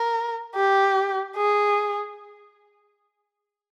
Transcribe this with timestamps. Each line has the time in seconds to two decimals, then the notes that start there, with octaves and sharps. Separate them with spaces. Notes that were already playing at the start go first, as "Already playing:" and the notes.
Already playing: A#4
0.56 G4
1.37 G#4